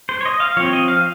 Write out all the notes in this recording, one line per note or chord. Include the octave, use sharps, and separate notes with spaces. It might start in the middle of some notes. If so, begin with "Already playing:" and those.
C5
C#5
D#5
F5
F3 C4 C#5
D#5
F5